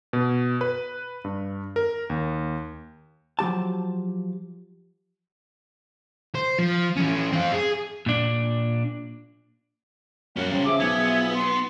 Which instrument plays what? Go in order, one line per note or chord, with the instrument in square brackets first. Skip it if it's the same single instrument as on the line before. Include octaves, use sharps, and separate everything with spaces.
[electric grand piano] B2
B4
G2
A#4
D#2
[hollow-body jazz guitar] F3 F#3 G4 A5
[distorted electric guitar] C5
F3
E3 C#4
C4 F4
G#4
[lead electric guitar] A#2 D4
[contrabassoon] F#2 [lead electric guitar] G3 C#4 [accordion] F5 F#5
[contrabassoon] C#3 [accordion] C4
[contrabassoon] C#3 [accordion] F3 G#4 E5 [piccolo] D6
[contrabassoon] B1 [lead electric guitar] B3 [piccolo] G#6
[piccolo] C6